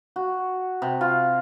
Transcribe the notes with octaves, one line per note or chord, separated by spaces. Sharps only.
F#4
C3
F4